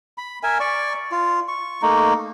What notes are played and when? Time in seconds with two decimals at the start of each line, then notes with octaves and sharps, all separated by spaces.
0.18 B5
0.43 A#4 E5 G#5
0.60 D5 C#6
1.12 F4
1.48 C#6
1.82 A3 A#3 D#4